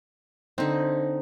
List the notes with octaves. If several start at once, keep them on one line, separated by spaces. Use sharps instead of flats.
D3 C4 D#4